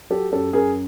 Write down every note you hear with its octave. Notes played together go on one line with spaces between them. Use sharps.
F#3 G4 A4
F#2 G4 A4
F#2 G#4 A#4